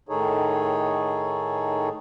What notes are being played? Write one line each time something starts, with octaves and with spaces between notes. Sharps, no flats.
A2 D#3 D#4 G#4 A4 C#5